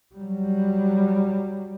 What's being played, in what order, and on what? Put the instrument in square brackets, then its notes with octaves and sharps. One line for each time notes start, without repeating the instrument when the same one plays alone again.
[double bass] F#3 G3